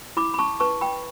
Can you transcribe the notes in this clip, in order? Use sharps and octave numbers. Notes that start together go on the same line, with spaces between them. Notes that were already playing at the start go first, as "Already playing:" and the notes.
E4 B5 D6
B5
A5 C#6
B4 A5 C#6
G5 B5